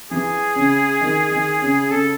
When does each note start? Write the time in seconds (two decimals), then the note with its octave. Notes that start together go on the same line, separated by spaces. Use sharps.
0.11 E3 G#4
0.56 C#3
1.01 D#3
1.31 D#3
1.61 C#3
1.90 C#3 A4